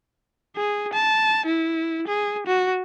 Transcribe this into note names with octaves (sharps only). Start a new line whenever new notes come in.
G#4
A5
E4
G#4
F#4